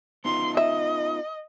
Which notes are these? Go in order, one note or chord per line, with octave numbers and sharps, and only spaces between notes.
B3 D#4 F4 C6
D#5 E5